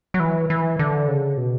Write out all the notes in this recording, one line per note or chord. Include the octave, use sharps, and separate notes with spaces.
F#3
E3
E3
D3
C#3
B2